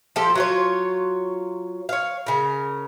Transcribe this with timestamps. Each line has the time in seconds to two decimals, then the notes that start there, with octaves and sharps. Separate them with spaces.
0.16 F3 G4 A4
0.35 F#3 F4 C#5
1.89 C#5 F5
2.26 C#3 A#4